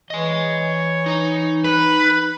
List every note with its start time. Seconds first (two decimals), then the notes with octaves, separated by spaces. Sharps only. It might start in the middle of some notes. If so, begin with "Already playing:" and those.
0.10 E3 C#5 D#5 G#5
1.06 D#4 A#5
1.64 B4 F#6